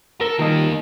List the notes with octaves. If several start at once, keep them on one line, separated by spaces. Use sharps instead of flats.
A4 A#4
D#3 G3 A#3 D#5